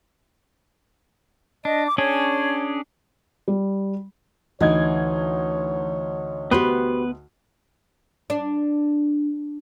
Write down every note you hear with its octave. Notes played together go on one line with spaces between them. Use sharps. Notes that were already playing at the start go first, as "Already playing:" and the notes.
D4 D#5
D6
C#4 D4 G#4 C#5
G3
D2 E3 D#4 C#5 G#6
B3 F#4 G4 B4 C5
D4